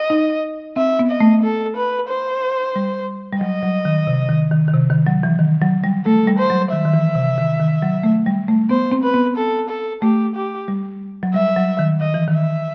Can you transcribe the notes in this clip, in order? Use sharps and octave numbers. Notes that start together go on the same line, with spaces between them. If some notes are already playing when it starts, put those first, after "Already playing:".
Already playing: D#5
D#4
C4 E5
B3
D#5
A3
A4
B4
C5
G3
G3
F#3 D#5
F#3
D#3
C3
D#3
D#3
D#3
C3
D#3
F#3
E3
D#3
F#3
G3
A3 A4
G3
C5
F#3
D#3 E5
D#3
E3
C3
D#3
D#3
F#3
A3
G3
A3
B3 C5
C4
B4
B3
A4
A4
A3 G4
G4
G3
F#3
G3 E5
F#3
D#3
D#3 D#5
E3
D#3
E5